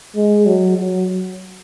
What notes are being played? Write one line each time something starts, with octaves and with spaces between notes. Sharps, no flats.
G#3
F#3
F#3